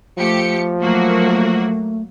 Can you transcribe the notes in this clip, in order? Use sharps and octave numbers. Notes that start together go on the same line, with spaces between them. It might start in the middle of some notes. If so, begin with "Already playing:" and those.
F3 A3 G4 C#7
F#3 A3 A#3 F#4